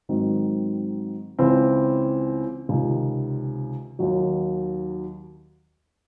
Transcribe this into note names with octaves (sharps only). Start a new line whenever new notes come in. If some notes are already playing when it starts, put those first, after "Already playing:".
G#2 D#3 F#3 C4
C#2 C#3 E3 C4
C#2 C3 D#3
D#2 D#3 F#3